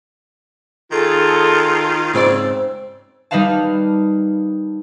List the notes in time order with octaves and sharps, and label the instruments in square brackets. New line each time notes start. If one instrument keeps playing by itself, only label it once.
[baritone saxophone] D#3 [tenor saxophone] F4 [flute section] G#4 A4
[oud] G#2 C4 D5 [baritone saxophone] C#3 [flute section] E6
[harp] G3 D#4 A#4 B4 F5 A5